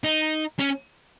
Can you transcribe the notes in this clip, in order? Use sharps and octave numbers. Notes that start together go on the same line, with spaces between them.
D#4
C#4